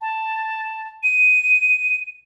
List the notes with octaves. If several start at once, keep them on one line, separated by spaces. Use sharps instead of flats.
A5
D#7